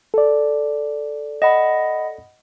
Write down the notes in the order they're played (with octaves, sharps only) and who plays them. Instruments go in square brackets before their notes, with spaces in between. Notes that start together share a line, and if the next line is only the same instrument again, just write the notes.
[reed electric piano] A4 D5
[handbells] D#5 F#5 B5